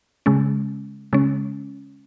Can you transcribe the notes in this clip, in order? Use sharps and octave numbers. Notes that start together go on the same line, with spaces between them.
C#3 G#3 C#4
C#3 G#3 C#4